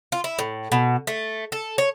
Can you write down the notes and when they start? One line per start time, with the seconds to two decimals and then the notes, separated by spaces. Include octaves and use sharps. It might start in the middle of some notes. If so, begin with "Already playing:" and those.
0.12 F4
0.24 E4
0.39 A2
0.72 B2
1.07 A3
1.52 A4
1.78 C#5